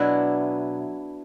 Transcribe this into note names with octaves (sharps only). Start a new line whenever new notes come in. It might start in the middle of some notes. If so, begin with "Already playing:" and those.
Already playing: B2 F#3 D4 E4